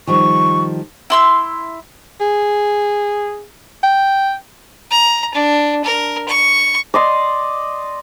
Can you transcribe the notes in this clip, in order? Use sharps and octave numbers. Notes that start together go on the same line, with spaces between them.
D#3 F3 G3 C#6
E4 C6 E6
G#4
G5
A#5
D4
A#4
C#6
D5 D#5 C6